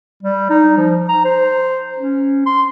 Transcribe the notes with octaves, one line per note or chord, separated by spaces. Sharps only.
G3
D#4
F3
A#5
C5
C#4
C6